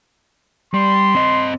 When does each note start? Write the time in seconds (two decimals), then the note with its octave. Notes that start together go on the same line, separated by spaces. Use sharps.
0.74 G3 C6
1.15 C4 D#5